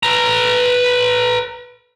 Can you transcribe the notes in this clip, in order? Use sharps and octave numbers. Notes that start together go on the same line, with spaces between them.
B4 A#5